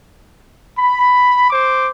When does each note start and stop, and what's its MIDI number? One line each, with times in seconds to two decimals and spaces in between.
0.77 1.47 83
1.49 1.88 72
1.49 1.88 86